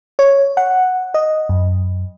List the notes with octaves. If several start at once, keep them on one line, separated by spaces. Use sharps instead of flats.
C#5
F#5
D#5
F#2